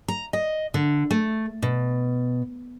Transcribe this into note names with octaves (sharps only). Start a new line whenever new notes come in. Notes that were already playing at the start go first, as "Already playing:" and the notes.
A#5
D#5
D3
A3
B2